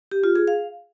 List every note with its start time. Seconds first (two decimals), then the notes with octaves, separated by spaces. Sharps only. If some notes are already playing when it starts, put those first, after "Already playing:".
0.12 G4
0.24 F4
0.36 G#4
0.48 F5